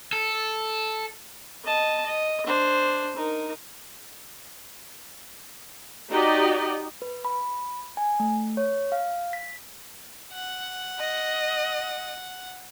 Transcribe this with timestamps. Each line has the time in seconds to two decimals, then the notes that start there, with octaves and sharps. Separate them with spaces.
0.13 A4
1.65 D#5 A5
2.06 D#5
2.47 D4 C5
3.16 D#4 A#4
6.10 D#4 F#4 G4 D5 D#5 G5
7.02 B4
7.25 B5
7.97 G#5
8.20 A3
8.57 C#5
8.92 F5
9.33 B6
10.32 F#5
10.99 D#5